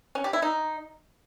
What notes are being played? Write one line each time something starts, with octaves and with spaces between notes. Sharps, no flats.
C#4
G4
E4
D#4